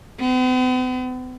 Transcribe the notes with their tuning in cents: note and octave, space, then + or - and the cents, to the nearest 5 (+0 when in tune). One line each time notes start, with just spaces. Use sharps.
B3 +45